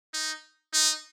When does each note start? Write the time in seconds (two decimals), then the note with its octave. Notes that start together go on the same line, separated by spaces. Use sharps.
0.14 D#4
0.74 D#4